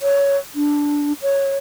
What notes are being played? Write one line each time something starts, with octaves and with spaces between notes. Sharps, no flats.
C#5
D4
C#5